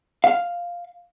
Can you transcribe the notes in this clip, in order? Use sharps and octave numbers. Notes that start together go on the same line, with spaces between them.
F5